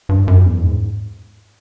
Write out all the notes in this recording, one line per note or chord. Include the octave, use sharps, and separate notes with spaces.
G2
F#2
E2
G#2